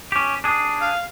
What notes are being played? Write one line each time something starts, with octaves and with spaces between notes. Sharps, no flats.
C#4 G4
D4 G#4
F5